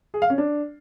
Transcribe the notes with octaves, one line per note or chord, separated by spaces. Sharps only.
G#4
F5
C#4
D4